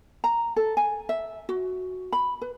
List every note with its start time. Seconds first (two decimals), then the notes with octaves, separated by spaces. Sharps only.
0.24 A#5
0.56 A4
0.77 G#5
1.09 E5
1.49 F#4
2.12 B5
2.41 B4